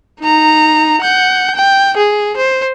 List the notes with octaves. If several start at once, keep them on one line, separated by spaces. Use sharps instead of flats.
D#4 A#5
F#5 G6
G5
G#4
C5